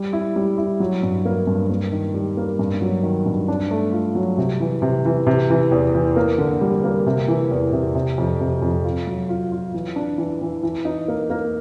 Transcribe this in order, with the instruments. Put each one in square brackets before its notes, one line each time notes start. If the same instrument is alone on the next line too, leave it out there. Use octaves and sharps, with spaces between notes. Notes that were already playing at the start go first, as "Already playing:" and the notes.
Already playing: [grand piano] G3
E4
G3
E4
F#3
G2
A#3
G2
A#3
D#3
G3
A#3
G2
F#3
D#3
G2
D4
A3
F4
F#3
C3
E3
C3
E3
C3
E3
E2
E3
A#3
D3
G3
A#3
C3
E3
E2
C3
C3
F2
C3
F2
F4
F#3
F4
F4
E3
D4
E3
E3
E3
D#4
A#3
A#3